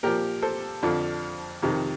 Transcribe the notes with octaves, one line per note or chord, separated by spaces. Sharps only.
A#2 F3 G4 A#4
A4 C5
F2 D3 F3
F2 C3 D#3